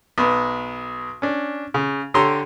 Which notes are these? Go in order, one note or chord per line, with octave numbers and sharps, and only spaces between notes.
B1 B3
C#4 D4
C#3
D3 G4 A4 C#5 A#5 C6